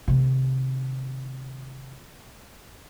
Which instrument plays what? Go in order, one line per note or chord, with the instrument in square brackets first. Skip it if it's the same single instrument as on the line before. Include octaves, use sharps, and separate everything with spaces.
[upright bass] C3 D#3